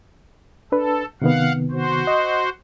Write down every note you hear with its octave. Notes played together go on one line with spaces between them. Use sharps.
D4 A4 B4
C3 D#3 B3 F5 F#5
F#4 C5
D#5